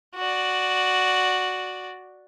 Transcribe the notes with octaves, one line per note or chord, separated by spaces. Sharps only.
F#4 D5